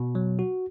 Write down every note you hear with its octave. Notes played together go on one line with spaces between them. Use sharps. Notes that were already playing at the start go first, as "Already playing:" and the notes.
Already playing: B2
F#3
F#4